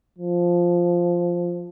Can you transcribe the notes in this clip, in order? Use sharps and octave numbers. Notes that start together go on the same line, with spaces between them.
F3